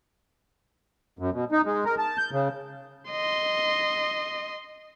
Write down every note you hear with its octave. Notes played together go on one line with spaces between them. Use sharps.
F#2
B2
D#4
G#3
A#4
A5
G6
C#3
D#5 C6